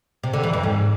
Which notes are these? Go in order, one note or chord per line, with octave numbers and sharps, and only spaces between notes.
C3
D3
E3
F2
G#2